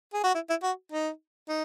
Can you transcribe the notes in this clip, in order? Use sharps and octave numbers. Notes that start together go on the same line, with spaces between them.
G#4
F#4
E4
E4
F#4
D#4
D#4